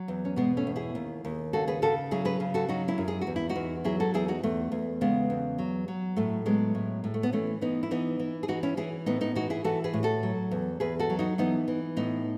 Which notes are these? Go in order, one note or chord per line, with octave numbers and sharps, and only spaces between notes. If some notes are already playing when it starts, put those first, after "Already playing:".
Already playing: F#3
E2
C#4
B2 G#3 B3
A3 C#4
E2
E4 G#4
D#2
D#2
C#3 F#4 A4
G#4 B4
C#3 F#4 A4
F#3 E4 G#4
G#4 B4
C#3
F#4 A4
F#3 D#4 F#4
C#4 E4
F#2
G#4
F#4
E2
E4
D#4 F#4
E2
F#3 E4 G#4
F#4 A4
E2 E4 G#4
D#4 F#4
E2 A3
E2
C#3 G#3 B3
E2
F#3
F#3
A2 A3
F#3 G#3 B3
A2
A2
A3
B3
E3 A3 C#4
E3 B3 D#4
E4
E3 B3 D#4
E3
G#4
E3 D#4 F#4
C#4 E4
E3 E4 G#4
A2 B3 D#4
B3 D#4
E3 D#4 F#4
E4 G#4
E3 F#4 A4
G#4 B4
A2
F#4 A4
F#3
E2
E2 G#4 B4
F#4 A4
F#3
D#4 F#4
E3 B3 D#4
E3
A2 B3 D#4